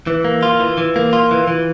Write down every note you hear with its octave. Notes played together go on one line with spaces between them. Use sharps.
E3
A#3
F4
E3
E3
A#3
F4
E3
E3